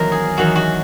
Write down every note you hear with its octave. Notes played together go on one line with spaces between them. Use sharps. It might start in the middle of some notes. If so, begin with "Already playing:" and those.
Already playing: E2 D#3 F#3 A#4
G#4
E2 D#3 F#3 F#4
F#4